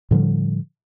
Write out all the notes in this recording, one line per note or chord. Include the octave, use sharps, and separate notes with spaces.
A2 D3 F3 G3